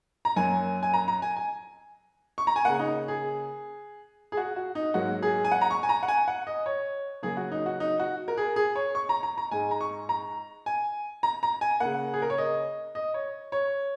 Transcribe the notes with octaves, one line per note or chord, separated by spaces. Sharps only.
A#5
F#2 F#3 A#3 G#5
G#5
A#5
A#5
G#5
G#5
C#6
A#5
G#5
C#3 A#3 F#5
D#4
G#4
G#4
F#4
F#4
D#4
G#2 F#3 A#3 F#4
G#4
G#5
F#5
A#5
C#6
G#5
A#5
F#5
G#5
F#5
D#5
C#5
C#3 F#3 A#3 G#4
F#4
D#4
F#4
D#4
F#4
A#4
G#4
G#4
C#5
C#6
A#5
A#5
A#5
G#2 G#3 G#5
A#5
C#6
A#5
G#5
A#5
A#5
G#5
C#3 A#3 F#5
G#4
A#4
C#5
D#5
D#5
C#5
C#5